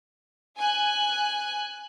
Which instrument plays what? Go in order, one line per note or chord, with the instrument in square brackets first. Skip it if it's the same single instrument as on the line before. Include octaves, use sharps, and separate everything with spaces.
[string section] G#5 F#6